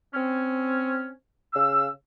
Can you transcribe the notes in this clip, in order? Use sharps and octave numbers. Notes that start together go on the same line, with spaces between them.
C4 C#4
C#3 F5 E6